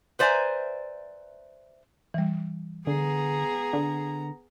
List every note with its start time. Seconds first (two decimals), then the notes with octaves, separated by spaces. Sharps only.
0.19 B4 C5 D5 E5 G#5 A#5
2.14 E3 G3
2.87 D3 B3 G#4 A#5
3.73 D3